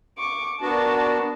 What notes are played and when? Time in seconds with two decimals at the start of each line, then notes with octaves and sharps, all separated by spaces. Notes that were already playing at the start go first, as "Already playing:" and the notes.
0.18 C#6 D6
0.61 B3 D4 F#4 A#4 A5